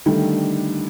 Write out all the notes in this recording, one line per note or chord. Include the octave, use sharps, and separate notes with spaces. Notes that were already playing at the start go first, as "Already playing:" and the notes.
D3 D#3 G3 A3